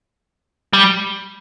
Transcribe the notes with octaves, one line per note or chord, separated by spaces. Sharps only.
G3